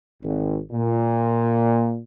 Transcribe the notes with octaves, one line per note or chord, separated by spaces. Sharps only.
G#1
A#2